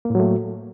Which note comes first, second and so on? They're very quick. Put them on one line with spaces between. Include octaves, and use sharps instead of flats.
A#3 A2 F#3 A3